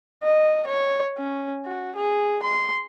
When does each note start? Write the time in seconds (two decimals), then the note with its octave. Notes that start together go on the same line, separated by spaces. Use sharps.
0.24 D#5
0.67 C#5
1.18 C#4
1.65 F#4
1.96 G#4
2.43 C6